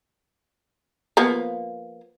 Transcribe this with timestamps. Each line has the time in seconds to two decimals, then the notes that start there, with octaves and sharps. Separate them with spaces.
1.17 F3 A#3 B3